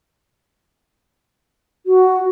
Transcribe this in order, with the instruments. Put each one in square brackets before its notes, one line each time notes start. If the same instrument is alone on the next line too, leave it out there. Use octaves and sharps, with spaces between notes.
[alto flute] F#4